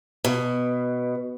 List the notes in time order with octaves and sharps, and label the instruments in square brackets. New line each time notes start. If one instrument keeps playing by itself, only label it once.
[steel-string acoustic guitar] B2